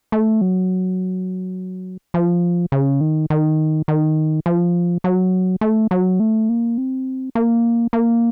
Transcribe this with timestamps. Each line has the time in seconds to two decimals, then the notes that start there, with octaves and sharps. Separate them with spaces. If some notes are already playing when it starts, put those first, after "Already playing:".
0.12 A3
0.41 F#3
2.14 F3
2.72 C#3
3.01 D#3
3.30 D#3
3.88 D#3
4.46 F3
5.04 F#3
5.61 A3
5.91 F#3
6.20 A3
6.49 A#3
6.78 C4
7.35 A#3
7.93 A#3